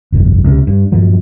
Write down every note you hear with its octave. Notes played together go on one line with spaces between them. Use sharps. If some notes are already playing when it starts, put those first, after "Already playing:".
G1 C2 F2
C#2 C3
G2
G2 A#2 F3 F#3